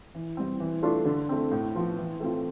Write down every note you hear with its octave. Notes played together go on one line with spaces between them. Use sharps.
E3
G3 C4
E3
A3 D4 F4
D3
A3 C4
A2
F3 B3 F4
E3
A3 C4 F4